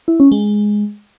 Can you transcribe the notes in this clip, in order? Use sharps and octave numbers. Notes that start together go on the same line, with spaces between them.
E4
C#4
G#3